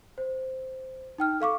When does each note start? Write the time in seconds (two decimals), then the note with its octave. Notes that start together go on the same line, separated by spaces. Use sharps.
0.18 C5
1.18 D#4 G5 F6
1.40 A4 F5 C#6 D6